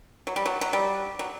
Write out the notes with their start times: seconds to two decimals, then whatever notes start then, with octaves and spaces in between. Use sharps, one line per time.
0.27 F#3
0.36 G3
0.46 F#3
0.61 F#3
0.73 G3
1.19 F#3